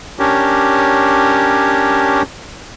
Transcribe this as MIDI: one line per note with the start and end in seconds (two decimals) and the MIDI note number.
0.19 2.22 61
0.19 2.22 62
0.19 2.22 67
0.19 2.22 70
0.19 2.22 73